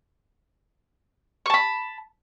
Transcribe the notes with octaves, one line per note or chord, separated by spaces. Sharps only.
A5 B5 C#6